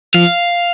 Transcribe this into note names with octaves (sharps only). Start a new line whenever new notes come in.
F3 F5